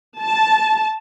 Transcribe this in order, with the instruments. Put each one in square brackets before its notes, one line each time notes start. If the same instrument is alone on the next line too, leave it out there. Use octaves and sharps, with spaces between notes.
[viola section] A5